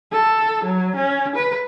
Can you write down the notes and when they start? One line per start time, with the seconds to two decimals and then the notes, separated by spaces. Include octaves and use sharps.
0.12 A4
0.65 F#3
0.96 C#4
1.36 B4